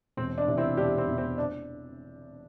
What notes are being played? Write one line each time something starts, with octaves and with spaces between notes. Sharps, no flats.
E1 C4
D4
E2 C3 E3
C4 E4
E1 D4 G4
C4 E4
E2 C3 E3
C4
D4